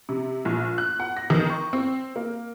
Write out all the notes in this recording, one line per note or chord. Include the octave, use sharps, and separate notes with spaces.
C3
A#1
F#6
F#5
A#6
D#3
C#6
C4
A#3